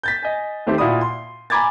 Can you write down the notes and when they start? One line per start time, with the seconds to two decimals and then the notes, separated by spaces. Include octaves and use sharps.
0.03 G6 A6 B6
0.23 D#5 G#5
0.66 D#3 A3 C4 G4 C5
0.78 A#2 E4 F#4 D5 B5 D#6
1.01 C6
1.50 G#5 A#5 B5 D6 G#6 A6